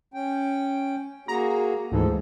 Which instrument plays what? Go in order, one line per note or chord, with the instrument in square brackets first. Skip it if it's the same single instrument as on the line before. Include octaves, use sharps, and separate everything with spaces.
[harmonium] C#4 G5
[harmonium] A#3 F#4 G#4 [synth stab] A#5
[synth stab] D2 G#2 E3 [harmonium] F3 G#3 A4